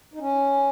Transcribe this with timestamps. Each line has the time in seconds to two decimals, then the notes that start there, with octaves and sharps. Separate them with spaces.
0.14 D#4
0.20 C#4